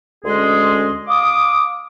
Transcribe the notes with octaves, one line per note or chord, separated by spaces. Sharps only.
D2 G#3 C#4 G#4 D#5 C6
F5 D6 D#6